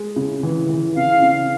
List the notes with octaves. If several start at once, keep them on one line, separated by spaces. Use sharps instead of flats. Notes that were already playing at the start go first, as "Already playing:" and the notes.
Already playing: G#3
C#3
E3
E3
C#3 F5
C#3